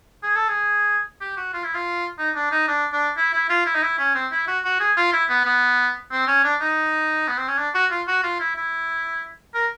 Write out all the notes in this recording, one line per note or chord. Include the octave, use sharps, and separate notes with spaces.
G#4
A4
G#4
G4
F#4
F4
E4
F4
D#4
D4
D#4
D4
D4
E4
E4
F4
E4
D#4
E4
C#4
C4
E4
F#4
F#4
G#4
F4
E4
B3
B3
C4
C#4
D4
D#4
B3
C4
C#4
D4
F#4
F4
F#4
F4
E4
E4
A#4